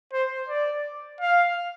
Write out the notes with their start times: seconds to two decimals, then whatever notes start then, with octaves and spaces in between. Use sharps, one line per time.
0.13 C5
0.48 D5
1.21 F5